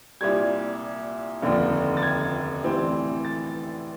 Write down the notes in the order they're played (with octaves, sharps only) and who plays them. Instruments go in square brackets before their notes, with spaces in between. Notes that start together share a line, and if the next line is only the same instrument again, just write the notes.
[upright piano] C2 A#2 G3 G#6
F1 D#2 D3 F3
A6
G#6
A2 E3 G3 C4
A6